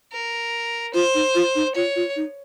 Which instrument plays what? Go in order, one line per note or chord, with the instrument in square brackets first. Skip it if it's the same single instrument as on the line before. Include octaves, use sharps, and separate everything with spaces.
[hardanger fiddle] A#4
[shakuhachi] F4 [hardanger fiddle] C5
[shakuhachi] D#4
F4
D#4
[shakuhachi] F4 [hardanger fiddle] C#5
[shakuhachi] F4
D#4